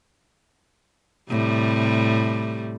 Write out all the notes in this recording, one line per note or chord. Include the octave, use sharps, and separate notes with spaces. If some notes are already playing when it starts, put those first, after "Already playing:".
A2 C3 G3